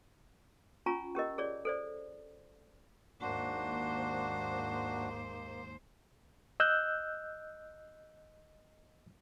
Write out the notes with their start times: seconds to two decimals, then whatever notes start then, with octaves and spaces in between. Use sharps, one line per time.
0.86 C#4 F4 G#5 A#5 C#6
1.15 C#4 G4 A#4 D#5
1.38 G#4 C#5 D5
1.65 A4 C5 D5
3.21 D#2 G#2 A#3 D4 F#4 C5
6.60 D#5 E6 F#6 G6